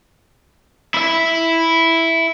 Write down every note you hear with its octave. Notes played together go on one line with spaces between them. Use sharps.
E4 E5